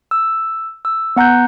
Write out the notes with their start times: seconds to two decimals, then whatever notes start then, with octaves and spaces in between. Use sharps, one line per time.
0.11 E6
0.85 E6
1.16 B3 F#5 A#5 F#6 G6